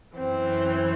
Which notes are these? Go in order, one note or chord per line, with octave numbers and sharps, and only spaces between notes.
F#2 E3 C4